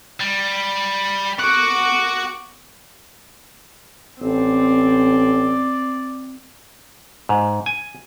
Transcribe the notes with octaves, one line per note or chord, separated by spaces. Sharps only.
G3
F#4 F#5 C#6 D6
A1 C4 D5
G#2
G#5